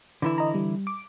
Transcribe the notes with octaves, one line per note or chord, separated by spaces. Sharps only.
D3 E3 E4
D#5 A#5
G3
D6